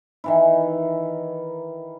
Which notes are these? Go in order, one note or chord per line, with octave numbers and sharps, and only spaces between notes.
D#3 E3 E4